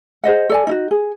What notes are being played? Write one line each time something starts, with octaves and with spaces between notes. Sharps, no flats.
G#4 C5 D#5 F#5
A4 D5 G#5
D#4 E4 F#4
G#4